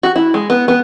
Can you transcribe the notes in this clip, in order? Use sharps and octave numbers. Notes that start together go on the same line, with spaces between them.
F#4
E4
G#3
B3
B3